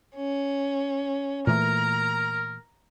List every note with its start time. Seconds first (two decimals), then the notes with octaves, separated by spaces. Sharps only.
0.14 C#4
1.47 A#2 E3 A3 A#4 A#5